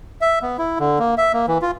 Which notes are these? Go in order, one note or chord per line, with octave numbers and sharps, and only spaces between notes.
E5
B3
E4
D3
A#3
E5
A#3
E3
F4